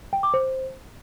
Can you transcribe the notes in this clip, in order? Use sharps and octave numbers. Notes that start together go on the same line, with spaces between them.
G5
D6
C5